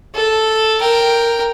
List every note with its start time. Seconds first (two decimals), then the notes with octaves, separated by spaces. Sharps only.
0.14 A4
0.80 A#4 G5